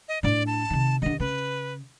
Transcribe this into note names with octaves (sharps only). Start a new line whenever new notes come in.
D#5
A2 D4 D5
A5
C3 D#3
D#2 D3 D#5
C#3 B4